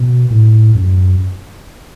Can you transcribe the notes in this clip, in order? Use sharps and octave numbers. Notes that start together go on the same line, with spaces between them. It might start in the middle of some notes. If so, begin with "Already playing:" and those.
Already playing: B2
A2
F#2